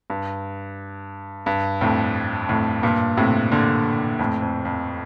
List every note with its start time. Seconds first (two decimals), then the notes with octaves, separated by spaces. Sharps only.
0.10 G2
1.46 G2
1.81 F2 A2
2.49 F2 A2
2.83 G2 A#2
3.17 A2 C3
3.52 A#2 D3
4.19 F2 A2
4.42 F2
4.65 F2